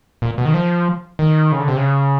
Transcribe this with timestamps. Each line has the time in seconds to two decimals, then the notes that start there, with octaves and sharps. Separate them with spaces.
0.22 A#2
0.38 B2
0.45 D#3
0.54 F3
1.19 D#3
1.52 C#3
1.60 D3
1.68 C3
1.77 C#3